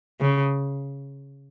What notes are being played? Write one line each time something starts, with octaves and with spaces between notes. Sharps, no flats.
C#3